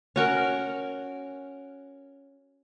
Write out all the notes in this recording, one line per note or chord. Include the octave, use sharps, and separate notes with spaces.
C#4 F#4 A#4